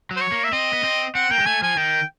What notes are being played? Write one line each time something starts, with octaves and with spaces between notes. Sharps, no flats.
F#3
C5
C#5
A#3
E5
C4 D#5
B3
C4
C4 F#5
A#3 G5
G#3
A3 G#5
F3 G#5
D#3 G5